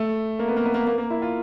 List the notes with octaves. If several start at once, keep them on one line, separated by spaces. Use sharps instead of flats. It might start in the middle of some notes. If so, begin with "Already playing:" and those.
Already playing: A3
A#3
B3
A#3
B3
A#3
A#3
A#3
E4
F4